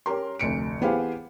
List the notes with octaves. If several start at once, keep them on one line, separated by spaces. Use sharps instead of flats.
C#4 G4 A#4 C6
F1 D2 C#7 D7
E3 B3 G4 G#4 C5 F5